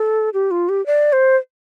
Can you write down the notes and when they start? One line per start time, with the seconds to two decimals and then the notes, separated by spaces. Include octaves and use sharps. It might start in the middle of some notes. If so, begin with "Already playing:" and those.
Already playing: A4
0.34 G4
0.51 F4
0.69 G4
0.86 D5
1.13 C5